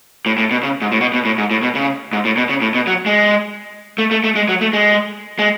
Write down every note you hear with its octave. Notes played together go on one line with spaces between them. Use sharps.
A2
A2
B2
C#3
G#2
A2
B2
B2
A2
G#2
A2
B2
C#3
G#2
A2
B2
C#3
A2
B2
F#3
G#3
A3
A3
A3
G#3
F#3
A3
G#3
G#3